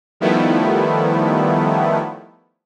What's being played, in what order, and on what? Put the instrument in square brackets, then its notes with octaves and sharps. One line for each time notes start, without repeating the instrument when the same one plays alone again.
[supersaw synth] D#3 F3 G3 A3 B3 E4